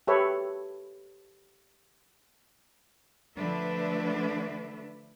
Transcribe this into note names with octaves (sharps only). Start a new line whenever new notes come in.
G4 A4 B4 C#5 E5
D3 F3 A3 D4 B4 E5